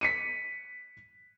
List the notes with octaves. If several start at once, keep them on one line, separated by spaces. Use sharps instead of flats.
B6 C#7 D#7